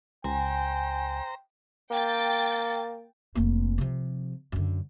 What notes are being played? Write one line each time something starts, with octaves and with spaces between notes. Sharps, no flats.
C#2 C5 G5 G#5 A#5
A#3 G5 A6
F1 A#3
C3 F3
F#2 D3